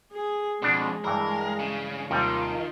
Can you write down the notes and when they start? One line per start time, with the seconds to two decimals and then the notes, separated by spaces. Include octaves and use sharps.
0.12 G#4
0.62 F2 B2 G#3 D4
1.04 G2 E3 A#4
1.59 C#3
2.11 D#2 C3 D#3 G3 F4